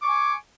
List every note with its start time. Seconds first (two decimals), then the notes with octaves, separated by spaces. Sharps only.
0.01 D6
0.04 C#6
0.06 G#5